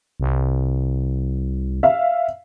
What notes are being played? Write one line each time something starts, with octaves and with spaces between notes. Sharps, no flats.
C2
E5 F5